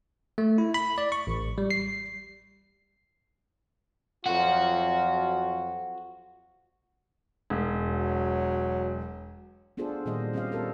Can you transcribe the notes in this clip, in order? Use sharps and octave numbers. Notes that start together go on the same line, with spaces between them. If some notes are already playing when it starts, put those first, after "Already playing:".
A3
E4
B5
D5
C#6
A1
G3
C7
F2 F#3 F4 F#4
E1
F#3
B3 D4 F4 G#4 A4 C5
A#2 D#3 G3 A#3 C5 D#5
G3 C4 C#4 G4 D#5 F5
B3 C4 G4 A4 A#4